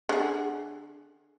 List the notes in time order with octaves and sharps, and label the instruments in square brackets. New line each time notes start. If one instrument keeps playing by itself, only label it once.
[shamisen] D3 G#4